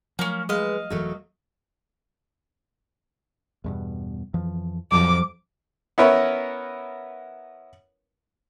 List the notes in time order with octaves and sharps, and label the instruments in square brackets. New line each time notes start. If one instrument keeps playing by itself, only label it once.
[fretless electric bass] F3 F#3 A3 [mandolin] A#3 C#4
[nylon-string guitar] G#3 B4 [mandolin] D#5 F5
[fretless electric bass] E1 E3 [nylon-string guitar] F#3 A3 A#4
[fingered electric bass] E2 G2 B2
F2 E3 F3
[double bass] F2 F3 [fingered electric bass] F#3 [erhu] D6
[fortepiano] B3 C#4 E4 A#4 B4 C#5